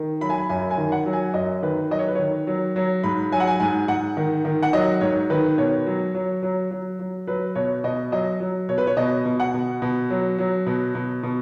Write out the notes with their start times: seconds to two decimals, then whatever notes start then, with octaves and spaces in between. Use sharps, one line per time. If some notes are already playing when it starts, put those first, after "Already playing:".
Already playing: D#3
0.21 F#3 B5
0.30 G#5
0.38 B5
0.49 F#2 G#5
0.71 G#5
0.78 D#3
0.92 F#5
1.06 F#3
1.13 G#5
1.34 F#2 D#5
1.63 D#3 B4
1.90 F#3 D#5
1.99 C#5
2.08 B4
2.15 D#3 C#5
2.47 F#3
2.76 F#3
3.04 G#2 B5
3.32 F#3 G#5
3.40 F#5
3.47 G#5
3.60 G#2 G#5
3.88 G#2 F#5
4.17 D#3
4.45 D#3
4.62 F#5
4.73 F#3 D#5
5.01 G#2 C#5
5.30 D#3 B4
5.58 B2 C#5
5.86 F#3
6.14 F#3
6.43 F#3
6.71 F#3
6.99 F#3
7.27 F#3 B4
7.55 B2 C#5
7.84 B2 D#5
8.12 F#3 D#5
8.40 F#3
8.69 B2 C#5
8.78 B4
8.87 C#5
8.97 B2 D#5
9.25 B2
9.40 F#5
9.54 B2
9.82 B2
10.10 F#3
10.38 F#3
10.66 B2
10.95 B2
11.23 B2